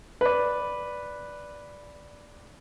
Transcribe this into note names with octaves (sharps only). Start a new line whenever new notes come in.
B4 D5